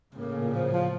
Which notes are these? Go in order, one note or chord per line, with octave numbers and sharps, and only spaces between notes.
A2 C#3 A#3
A#2
F3
F3